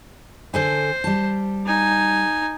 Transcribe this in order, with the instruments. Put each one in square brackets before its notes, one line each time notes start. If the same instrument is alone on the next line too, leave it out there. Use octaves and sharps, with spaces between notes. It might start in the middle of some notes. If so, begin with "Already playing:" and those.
[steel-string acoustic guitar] D3 A4 G#5 [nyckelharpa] C5
[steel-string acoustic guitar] G3 A5
[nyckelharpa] D#4 G#5